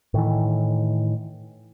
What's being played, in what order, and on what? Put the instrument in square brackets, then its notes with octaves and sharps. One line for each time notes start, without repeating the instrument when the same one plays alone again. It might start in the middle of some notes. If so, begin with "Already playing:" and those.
[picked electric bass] A2 D#3 E3